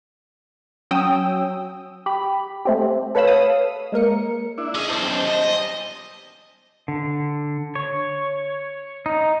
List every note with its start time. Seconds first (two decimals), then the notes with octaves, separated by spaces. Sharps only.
0.91 F#3 C#4 G5 D#6 E6
2.06 G4 B5
2.65 A3 C4 G4
3.15 A4 B4 C#5 F5 B5 E6
3.27 F5 D#6
3.92 G#3 A#3 A#4 C#7
4.58 D4 E4
4.75 C#4 G#4 D#5
4.89 B1 C5 A5
5.02 F#2 C3 D#3
5.27 D#5
5.42 A#2 G3
6.88 D3
7.75 C#5
9.06 D#4